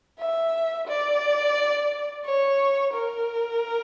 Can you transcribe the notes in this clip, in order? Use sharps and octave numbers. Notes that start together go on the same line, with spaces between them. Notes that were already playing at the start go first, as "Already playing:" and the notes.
E5
D5
C#5
A#4